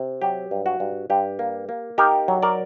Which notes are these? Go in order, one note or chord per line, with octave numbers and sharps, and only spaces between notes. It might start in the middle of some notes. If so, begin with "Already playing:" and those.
Already playing: C3
F#3 G4
G2
F#4
G2
G2 G4
A#3
A#3
D#4 G4 A#4
F#3
A#4 D5